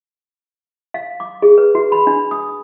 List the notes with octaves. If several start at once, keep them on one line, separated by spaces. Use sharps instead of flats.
F5
D6
G#4
B4
F#4
B5
D4
D#6